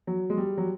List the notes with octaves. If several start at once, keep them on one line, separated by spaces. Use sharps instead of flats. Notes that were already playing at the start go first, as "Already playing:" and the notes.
F#3
G#3
G3
F#3